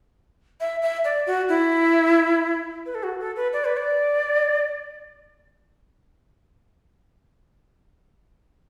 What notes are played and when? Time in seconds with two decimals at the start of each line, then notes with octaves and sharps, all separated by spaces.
0.60 E5
0.82 E5
1.05 D5
1.27 F#4
1.49 E4
2.86 B4
2.95 A4
3.03 F#4
3.20 A4
3.36 B4
3.53 D5
3.65 B4
3.77 D5